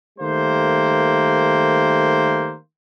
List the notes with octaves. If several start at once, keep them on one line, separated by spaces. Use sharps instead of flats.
D#3 G3 A3 A#3 C5